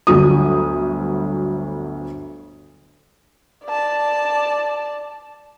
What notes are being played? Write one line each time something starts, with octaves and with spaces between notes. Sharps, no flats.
G1 D2 F#3 D#6
D5 A5